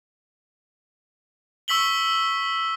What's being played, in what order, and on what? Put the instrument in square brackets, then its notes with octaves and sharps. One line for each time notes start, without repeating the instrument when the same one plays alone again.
[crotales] C#6 E6 B6 F#7 G7